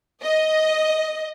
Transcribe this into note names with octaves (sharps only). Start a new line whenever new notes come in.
D#5